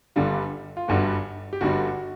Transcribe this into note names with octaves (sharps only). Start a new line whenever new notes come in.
G1 G2 D3 G3 F4
F4
G1 G2 D3 G3 F#4
G4
G1 G2 D3 G3 F#4